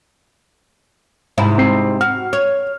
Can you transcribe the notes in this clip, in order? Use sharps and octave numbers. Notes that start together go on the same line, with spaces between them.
G#2 C3 E4
C4 C7
F#4 F6
C#5